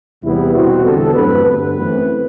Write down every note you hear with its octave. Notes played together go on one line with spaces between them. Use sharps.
E2 C3 G3 B3 E4
B2 G3 C4 F#4
E2 D3 G3 B3 A4
G2 F#3 A3 C4 B4
G2 D3 G3 B3 B4
F#2 E3 A3 C4